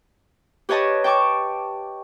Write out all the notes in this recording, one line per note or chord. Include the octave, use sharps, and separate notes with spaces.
G4 B4 C#5 D#5 A5
G5 A5 C#6 D6